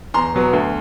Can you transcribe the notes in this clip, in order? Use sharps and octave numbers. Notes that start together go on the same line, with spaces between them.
E2 A#5 C6
B2 F#3 B3
D2